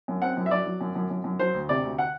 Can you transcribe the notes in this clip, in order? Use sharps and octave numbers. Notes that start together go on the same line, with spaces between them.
F#2
C4 F#5
F#2
E5
F#3 D5
F#3
F#2
F#2
F#2
F#2
F#3 C5
D2
C3 D5
D2
F#5